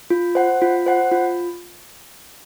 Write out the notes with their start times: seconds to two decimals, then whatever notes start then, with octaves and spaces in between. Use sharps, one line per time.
0.10 F4
0.35 C5 F#5
0.62 F4
0.86 C5 F#5
1.12 F4